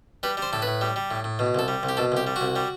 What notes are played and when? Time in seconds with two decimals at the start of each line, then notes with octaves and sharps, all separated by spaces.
0.23 G3 B4
0.37 G3 C5
0.53 A2 A4
0.62 B4
0.67 A2
0.81 G3
0.96 G3
1.11 A2
1.24 A2
1.39 B2
1.55 C2 A4
1.68 G3
1.83 C2
1.89 G4
1.97 B2 A4
2.12 C2 G4
2.27 G3
2.36 F#4
2.41 C2
2.56 G3